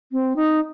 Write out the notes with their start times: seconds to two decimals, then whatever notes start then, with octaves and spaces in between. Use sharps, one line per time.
0.12 C4
0.36 D#4